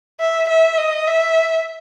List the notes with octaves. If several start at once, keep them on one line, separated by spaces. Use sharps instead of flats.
E5
E5
D#5
E5